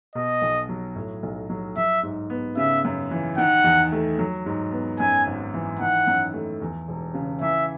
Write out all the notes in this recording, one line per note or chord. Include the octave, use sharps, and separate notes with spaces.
B2 D#5
B1
F#3
A2
B1
F#3
F#3 E5
G#2
B3
C#3 E5
F#2
E3
D#3 F#5
E2
A3
F#3
G#2
B3
F#2 G#5
G#1
E3
D#3 F#5
F#2
A3
E2
E1
C#3
E3 E5